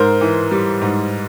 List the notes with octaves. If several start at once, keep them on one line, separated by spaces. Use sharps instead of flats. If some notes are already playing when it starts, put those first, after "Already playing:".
Already playing: G#2 A#4 C5
E3
G3
G#2